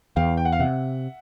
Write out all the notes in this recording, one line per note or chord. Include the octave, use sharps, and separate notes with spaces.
E2 F5 G5
G5
F#5
F5
C3 E5 F#5